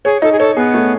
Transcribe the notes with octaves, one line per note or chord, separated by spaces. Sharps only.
G#4 C#5
D#4 A4
G#4
A4 C#5
B3 G#4
A3